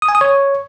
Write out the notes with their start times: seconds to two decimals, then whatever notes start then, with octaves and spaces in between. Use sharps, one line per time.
0.02 D#6
0.08 G#5
0.15 D#6
0.21 C#5